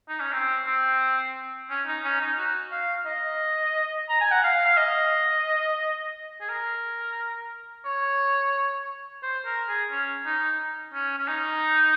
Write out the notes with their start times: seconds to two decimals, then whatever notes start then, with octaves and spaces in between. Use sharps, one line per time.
0.09 D#4
0.21 C#4
0.33 C4
0.67 C4
1.70 C#4
1.87 D#4
2.04 C#4
2.21 D#4
2.38 F#4
2.72 F5
3.06 D#5
4.09 A#5
4.21 G#5
4.31 F#5
4.44 F5
4.65 F5
4.77 D#5
6.41 G#4
6.49 A#4
7.85 C#5
9.23 C5
9.46 A#4
9.69 G#4
9.91 C#4
10.26 D#4
10.94 C#4
11.18 C#4
11.28 D#4